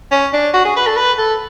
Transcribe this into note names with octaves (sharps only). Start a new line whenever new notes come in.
C#4
D4
F#4
G#4
B4
A4
B4
A4